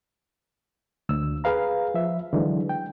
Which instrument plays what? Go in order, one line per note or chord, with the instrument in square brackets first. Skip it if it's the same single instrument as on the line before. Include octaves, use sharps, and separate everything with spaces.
[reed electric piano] D2 E6
G#4 B4 F5 A#5
F3 E5
D3 E3 F#3 G#3
G5